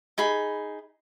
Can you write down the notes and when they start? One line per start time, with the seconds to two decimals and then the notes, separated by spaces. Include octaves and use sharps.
0.18 D#4 G#4 B5